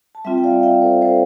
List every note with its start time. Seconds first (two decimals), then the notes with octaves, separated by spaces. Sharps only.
0.15 A5
0.25 G3 C4 F4 E5 G5
0.38 G5
0.44 D5 F5
0.63 E5 G5
0.82 A4 C5
1.02 A4 C5